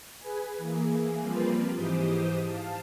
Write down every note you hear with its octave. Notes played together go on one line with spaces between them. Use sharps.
G#4 B4 G#5
E3 A#3 G#4
F3 G3 A#3 C4 F4 B4
G#2 E3 G4 C5 D#6
F5 A5